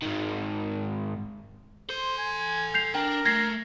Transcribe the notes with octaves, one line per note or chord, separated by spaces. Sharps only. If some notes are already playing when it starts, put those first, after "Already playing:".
G#2 D#3
A4 C5 C6
G#5
G6 C7 F7
D4 A#4 G5
A3 G#6 A#6 C7